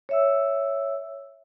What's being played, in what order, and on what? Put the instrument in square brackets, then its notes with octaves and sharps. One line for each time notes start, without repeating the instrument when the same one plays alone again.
[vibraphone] C#5 E5 E6